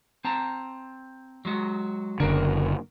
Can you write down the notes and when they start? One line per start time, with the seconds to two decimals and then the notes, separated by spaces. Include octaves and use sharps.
0.24 C4 A5 A#5
1.45 F#3 G#3 F#4
2.20 F#1 D3 D4 F#4 A#4